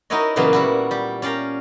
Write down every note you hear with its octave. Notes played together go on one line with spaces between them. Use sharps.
D#4 E4 F#4 A#4 C#5 D#5
A#2 C#3 E3 F#3 A#3 B3
G3 E4 F#4
G3 G4
C#4 D5 F5 G5 A#5